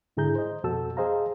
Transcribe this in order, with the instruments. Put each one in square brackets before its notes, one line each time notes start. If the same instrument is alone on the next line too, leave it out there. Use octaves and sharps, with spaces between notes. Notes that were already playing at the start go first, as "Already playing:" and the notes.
[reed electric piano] G#2 D3 E4 G#4 A#5 G6
C5 D#5
F2 B2 F#4 A4 A5 E6
G#4 C5 D#5 F5 A#5